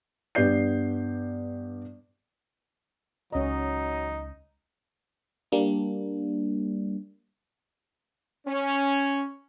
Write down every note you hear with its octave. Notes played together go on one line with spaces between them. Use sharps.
G2 B3 G4 D5 G6 C7
C#2 F#3 C#4 D#4 D#5 A#5
G3 A#3 D4
C#4